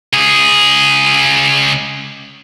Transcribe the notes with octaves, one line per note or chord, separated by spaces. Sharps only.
C#2 G#4